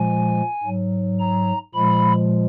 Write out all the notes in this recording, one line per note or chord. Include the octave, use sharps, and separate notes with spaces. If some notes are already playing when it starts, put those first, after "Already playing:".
Already playing: A#2 F3 G#3 G#5
G#2 F#3
A#5
A#2 F3 G#3 B5